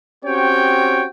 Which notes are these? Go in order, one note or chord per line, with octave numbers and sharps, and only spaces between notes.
C4 C#4 F#4 G4 C#5 G5